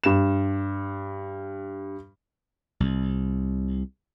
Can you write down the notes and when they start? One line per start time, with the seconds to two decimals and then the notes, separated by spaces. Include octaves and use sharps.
0.04 G2 E7
2.80 C2